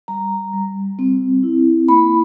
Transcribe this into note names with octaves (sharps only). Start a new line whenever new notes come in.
G3 A#5
G3
C4
E4
A#3 B5